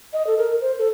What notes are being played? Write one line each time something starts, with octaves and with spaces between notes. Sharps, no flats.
D#5
A4
A#4
C5
A4